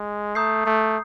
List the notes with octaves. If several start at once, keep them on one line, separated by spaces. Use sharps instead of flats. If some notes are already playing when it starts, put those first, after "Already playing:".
Already playing: G#3
A3 A#5 D#6 G6 C7
A3